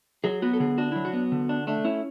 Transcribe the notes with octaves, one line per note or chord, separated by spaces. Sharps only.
F#3 G#4
B3 F#4
A4
D3 G#4
D4 F#4
F#3 E4
F#4
B3
D3
D4
A3 D4
C#4 E4